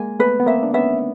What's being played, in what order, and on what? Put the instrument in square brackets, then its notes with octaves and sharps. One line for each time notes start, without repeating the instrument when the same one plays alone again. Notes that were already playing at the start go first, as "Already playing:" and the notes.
Already playing: [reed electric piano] G#3 A#3 [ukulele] G#5
[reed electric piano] A3 B3 [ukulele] B4
[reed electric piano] B3
[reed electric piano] A#3 C4 [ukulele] E5
[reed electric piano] D4
[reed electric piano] B3 C#4 [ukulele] E5